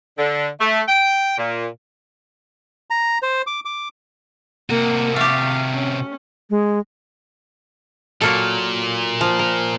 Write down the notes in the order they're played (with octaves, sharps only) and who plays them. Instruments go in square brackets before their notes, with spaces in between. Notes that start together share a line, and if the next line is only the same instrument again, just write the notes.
[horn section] D3
A3
G5
A#2
[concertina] A#5
C5
D6
D6
[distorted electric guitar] C3 F#4 [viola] A#3
[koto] A3 G4 [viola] F5
[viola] C#4
[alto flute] G#3
[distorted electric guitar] A#2 [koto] F#3 A#3 A4
[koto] F3
A#4